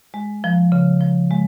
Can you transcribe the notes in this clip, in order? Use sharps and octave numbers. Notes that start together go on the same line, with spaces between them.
G#3
F3
C#3
F3
G#3